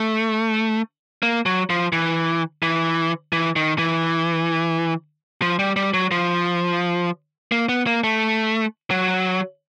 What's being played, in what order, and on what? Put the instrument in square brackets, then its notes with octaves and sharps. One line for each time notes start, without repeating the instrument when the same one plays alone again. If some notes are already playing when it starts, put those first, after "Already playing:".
Already playing: [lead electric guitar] A3
A#3
F#3
F3
E3
E3
E3
D#3
E3
F3
G3
G3
F#3
F3
A#3
B3
A#3
A3
F#3